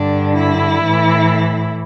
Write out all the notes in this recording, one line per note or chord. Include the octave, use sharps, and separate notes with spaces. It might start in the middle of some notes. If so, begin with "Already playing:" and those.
Already playing: G2 D3 D4
E4
A2 E3